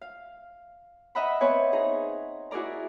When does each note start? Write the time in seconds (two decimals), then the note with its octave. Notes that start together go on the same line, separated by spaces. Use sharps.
0.01 F5
1.15 D#5 E5 F#5 A#5 B5
1.41 B3 C4 B4 C#5 G#5
1.72 D#4 G#4 A#5
2.51 E4 F#4 G#4 A#4 D5 A#5